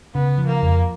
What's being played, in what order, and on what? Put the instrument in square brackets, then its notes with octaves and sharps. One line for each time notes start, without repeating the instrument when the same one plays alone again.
[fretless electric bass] C#3 [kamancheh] B3
[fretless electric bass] F3
[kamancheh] A#3
[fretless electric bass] F2